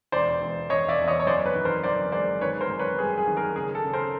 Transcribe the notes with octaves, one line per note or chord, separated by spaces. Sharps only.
E1 C5 D5
E1
E1 C#5 D#5
D5 E5
E2
C#5 D#5
C#5
F#2 C5 D5
B4 C#5
D#3
A#4 C5
G1 C5 D5
G#3 C5 D5
D#3 B4 C#5
A#4 C5
F#2
B4 C#5
G3 G#4
G#4
D#3
G#4 A#4
C#3 G#4
A4
C#3
A#4 C5